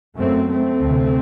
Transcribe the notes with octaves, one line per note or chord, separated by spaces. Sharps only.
F#2 A3 C4
A3 C4
D2 C3